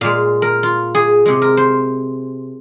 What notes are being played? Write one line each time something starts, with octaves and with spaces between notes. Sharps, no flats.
A#2 G#3 F5
A#4
F4
G#4
C3 G#3
A#4
C5